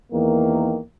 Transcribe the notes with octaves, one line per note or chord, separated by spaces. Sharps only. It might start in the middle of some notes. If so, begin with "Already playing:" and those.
E2 D#3 A#3